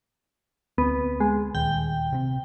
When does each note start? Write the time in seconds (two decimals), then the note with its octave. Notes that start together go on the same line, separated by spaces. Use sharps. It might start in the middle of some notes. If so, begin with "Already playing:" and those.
0.78 D2 B3 C4
1.20 G#3
1.55 D#1 D#2 G5
2.12 C3 C4